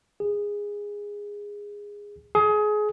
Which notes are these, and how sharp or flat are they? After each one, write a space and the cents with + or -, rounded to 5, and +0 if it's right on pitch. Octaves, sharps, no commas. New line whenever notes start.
G#4 -15
G#4 +25